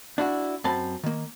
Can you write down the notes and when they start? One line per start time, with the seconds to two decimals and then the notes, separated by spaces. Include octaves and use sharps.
0.18 D4 E4 F#4
0.64 F#2 C4 A5 B5
1.03 D#3 A#3